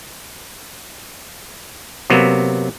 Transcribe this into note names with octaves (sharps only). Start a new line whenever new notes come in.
C3 F#3 A#3 B3